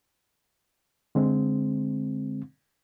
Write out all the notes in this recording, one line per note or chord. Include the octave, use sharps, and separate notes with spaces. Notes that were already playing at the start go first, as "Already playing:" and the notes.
D3 G#3 C4